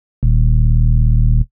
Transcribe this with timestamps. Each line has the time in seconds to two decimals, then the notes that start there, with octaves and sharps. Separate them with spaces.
0.23 D#1